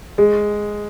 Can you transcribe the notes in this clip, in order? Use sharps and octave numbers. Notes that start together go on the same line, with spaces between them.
G#3